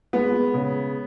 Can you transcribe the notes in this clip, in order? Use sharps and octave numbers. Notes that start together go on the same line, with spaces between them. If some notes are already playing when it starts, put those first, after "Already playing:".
G#3 B3
C#3